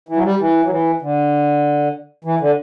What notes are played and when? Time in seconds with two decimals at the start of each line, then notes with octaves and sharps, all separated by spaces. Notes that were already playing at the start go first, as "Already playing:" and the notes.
0.09 E3
0.16 F#3
0.24 G3
0.40 E3
0.65 F#3
0.70 E3
1.02 D3
2.24 E3
2.41 D3